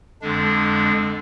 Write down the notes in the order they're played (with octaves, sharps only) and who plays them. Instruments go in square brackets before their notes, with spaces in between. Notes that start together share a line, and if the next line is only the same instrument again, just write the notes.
[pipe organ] F2 D3 G#3 D4